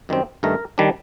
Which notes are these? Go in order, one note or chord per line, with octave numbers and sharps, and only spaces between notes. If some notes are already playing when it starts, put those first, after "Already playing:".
F#2 D#3 G3 C4
G2 D#3 A3 A#4
D#3 G3 D4